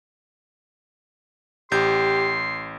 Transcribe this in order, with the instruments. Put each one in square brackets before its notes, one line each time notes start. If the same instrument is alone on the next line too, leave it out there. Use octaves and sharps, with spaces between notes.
[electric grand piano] A1 G6 [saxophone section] G4 [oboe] C6